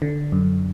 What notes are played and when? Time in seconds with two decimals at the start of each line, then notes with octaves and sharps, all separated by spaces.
0.02 D3
0.32 F#2